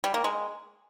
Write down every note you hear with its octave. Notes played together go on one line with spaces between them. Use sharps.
G3
A#3
G#3